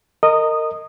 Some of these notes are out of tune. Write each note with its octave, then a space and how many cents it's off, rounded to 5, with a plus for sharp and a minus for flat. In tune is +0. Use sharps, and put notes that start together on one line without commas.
A#4 -25 D#5 +0 D#6 -15